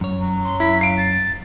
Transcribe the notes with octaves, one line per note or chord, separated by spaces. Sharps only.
F#2 C#5
F#3
C6
E4 B6
F5 C7 D7
A6